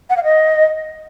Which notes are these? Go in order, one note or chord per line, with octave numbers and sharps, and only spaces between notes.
F#5
F5
D#5